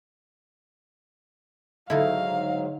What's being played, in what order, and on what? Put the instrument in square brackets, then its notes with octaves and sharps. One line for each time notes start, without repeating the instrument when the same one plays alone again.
[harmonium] G#2 F#3 [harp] D3 D#4 [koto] A3 E4 [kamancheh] F5